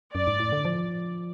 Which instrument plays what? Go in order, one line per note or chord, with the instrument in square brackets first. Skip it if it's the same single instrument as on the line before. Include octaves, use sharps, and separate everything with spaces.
[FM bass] F#2 [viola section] D5
[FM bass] G#2
A2
D3
F3